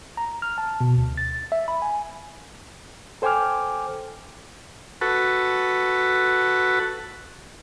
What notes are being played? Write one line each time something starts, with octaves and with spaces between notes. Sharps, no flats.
A#5
F6
A5
B2
D2
A6
E5
B5
G#5
A4 C5 G5 G#5 D6 F6
F#4 A4 B4